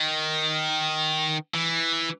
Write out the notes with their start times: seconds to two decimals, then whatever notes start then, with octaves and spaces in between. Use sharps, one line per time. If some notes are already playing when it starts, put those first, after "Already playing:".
Already playing: D#3
1.54 E3